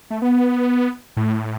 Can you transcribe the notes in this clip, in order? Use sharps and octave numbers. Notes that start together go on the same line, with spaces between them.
A3
B3
A2